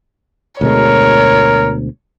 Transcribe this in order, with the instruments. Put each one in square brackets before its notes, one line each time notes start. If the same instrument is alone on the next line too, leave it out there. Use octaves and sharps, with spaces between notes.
[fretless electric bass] D2 B2 G#3 [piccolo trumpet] A#4 [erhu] C#5